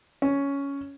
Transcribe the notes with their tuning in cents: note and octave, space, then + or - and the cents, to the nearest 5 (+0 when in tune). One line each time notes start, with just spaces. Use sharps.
C#4 +10